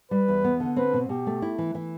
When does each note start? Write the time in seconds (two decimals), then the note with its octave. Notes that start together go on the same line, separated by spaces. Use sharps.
0.11 G3 B4
0.28 E2
0.44 B3
0.60 D3
0.76 C4 B4
0.93 B2
1.09 B2 G4
1.27 A3
1.42 E4
1.58 E3
1.75 E3